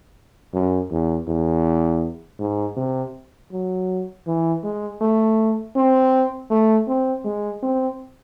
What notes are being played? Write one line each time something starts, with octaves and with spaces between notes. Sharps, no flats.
F#2
E2
E2
G#2
C3
F#3
E3
G#3
A3
C4
A3
C4
G#3
C4